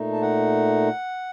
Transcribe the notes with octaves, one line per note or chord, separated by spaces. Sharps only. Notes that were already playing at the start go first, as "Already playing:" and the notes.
Already playing: A#2 A3 D#4
A5
F#5